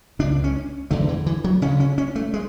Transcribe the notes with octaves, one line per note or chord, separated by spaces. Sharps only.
C#2 C#3 D4
C#4
E2 D3 A3
E3
E3
F#3
D2 C#3 C#4
C#4
C#4
A3
G#3